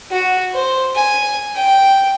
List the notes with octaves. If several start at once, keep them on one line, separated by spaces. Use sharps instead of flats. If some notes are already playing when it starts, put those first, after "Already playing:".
F#4
C5
G#5
G5